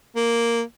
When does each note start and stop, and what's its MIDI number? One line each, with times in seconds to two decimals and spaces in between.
0.16 0.62 58